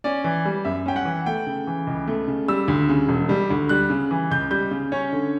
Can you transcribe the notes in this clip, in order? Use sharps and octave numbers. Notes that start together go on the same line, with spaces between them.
C#4 D5
E3
G3
F#2 E5
C#4 G5
F#5
E3
A3 G5
C#3
E3
C#2
A3
C#3
G3 E6
D2
C#3
E1
G3
D2
G3 F#6
C#3
E3
C#2 G6
G3 G6
C#3
C#4 C#5
D3